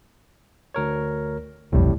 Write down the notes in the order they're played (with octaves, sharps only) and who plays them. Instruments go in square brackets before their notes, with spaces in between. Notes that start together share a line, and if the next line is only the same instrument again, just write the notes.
[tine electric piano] D2 A#4 C#5
[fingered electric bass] D#1 B1 F2 [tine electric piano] A2 C3 G3